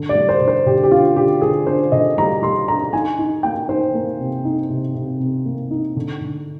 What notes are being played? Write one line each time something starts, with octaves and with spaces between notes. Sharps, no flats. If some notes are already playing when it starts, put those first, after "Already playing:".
Already playing: D3
D5
G3
C5
D3
C5
D3 G4
G4
D4 F4
D3 G4
D3 G#4
D4 C5
D3 D#5
G3 A#5
G3 C6
D4 A#5
D#4 G#5
D#4
A#3 G5
D#4 C5
A#3
C3
D#4
C3
C3
C3
A#3
D#4
D3
D3